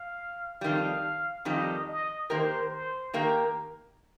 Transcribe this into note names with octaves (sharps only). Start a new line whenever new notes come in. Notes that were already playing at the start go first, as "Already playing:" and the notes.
Already playing: F5
F2 D#3 G3 F5
F2 D#3 G3 D#5
D#5
D#3 A#3 G4 A#4 C5
C5
D#3 A#3 G4 A#4